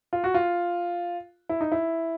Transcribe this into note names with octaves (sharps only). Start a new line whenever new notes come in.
F4
F#4
F4
E4
D#4
E4